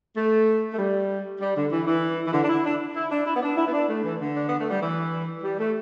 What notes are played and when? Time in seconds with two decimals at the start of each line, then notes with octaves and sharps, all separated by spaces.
0.16 A3
0.73 A3
0.78 G3
1.41 G3
1.56 D3
1.71 E3
1.87 E3
2.27 E3
2.33 D3
2.43 D4
2.48 E4
2.64 D4
2.95 E4
3.11 D4
3.26 E4
3.35 B3
3.42 D4
3.57 E4
3.67 B3
3.73 D4
3.89 A3
4.04 E3
4.20 D3
4.36 D4
4.47 B3
4.59 A3
4.70 G3
4.81 E3
5.43 G3
5.59 A3